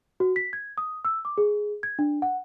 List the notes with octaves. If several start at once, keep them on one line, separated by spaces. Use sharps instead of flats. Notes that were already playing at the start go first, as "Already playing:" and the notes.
F#4
B6
G#6
D#6
E6
D6
G#4
G#6
D4
F#5